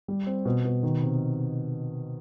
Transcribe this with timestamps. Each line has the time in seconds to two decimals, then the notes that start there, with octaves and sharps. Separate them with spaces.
0.08 G3
0.26 C4
0.45 B2
0.65 B2
0.83 D#3
1.02 C3